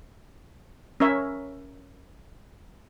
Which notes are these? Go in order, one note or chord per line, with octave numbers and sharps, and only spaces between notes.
C#4 A#4 C#5 E5